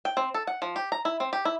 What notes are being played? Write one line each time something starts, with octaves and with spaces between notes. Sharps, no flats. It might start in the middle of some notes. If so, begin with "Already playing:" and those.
G5
C4
A4
F#5
F3
G4
A#5
E4
C4
G4
E4